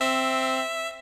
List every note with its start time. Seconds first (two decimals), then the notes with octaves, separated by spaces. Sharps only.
0.01 C4 E5